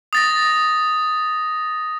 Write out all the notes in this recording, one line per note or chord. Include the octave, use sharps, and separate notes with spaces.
D#6 A6 A#6